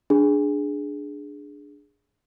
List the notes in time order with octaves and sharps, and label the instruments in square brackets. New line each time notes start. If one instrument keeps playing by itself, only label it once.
[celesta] D4 G#4